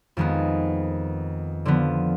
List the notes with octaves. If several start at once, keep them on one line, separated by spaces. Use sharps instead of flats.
F2 D#3 G#3 B3
D3 F3 B3